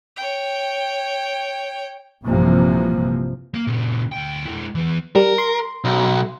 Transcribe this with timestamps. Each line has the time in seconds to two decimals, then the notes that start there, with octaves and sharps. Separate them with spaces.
0.16 C#5 G5
2.25 A#1 G2 C3 E3 F3 A#3
3.54 A#3
3.67 A#2 C#3
4.12 D2 G5
4.46 G#3 E4
4.75 E3 B3
5.16 G3 A#4
5.38 C6
5.84 B1